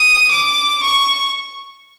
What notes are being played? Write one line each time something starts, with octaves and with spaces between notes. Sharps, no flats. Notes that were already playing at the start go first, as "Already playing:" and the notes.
Already playing: D#6
D6
C#6